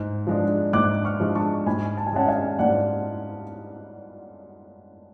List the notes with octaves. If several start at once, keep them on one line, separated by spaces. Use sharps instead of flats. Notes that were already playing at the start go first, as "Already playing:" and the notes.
Already playing: G#2
F3 G#3 D4
G#2 D6 F#6
C#6 F6
F3 G#3 D4
A5 C#6
G#2 G#5 B5
A5
G#5
G#3 C#4 F#5 A5
F5 G#5
G#2 D5 F#5